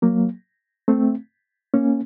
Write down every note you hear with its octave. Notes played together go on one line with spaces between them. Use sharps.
F#3 A#3
A3 C4
A#3 C#4